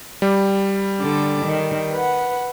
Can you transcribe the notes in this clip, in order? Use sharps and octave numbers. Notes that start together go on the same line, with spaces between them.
G3
D3 A4 D6
D#3
B4 F#5